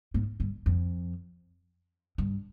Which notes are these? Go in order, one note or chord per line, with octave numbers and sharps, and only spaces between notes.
G#2
G2
F2
G2